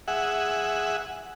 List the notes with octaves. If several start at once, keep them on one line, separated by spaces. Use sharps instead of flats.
G#4 E5 F#5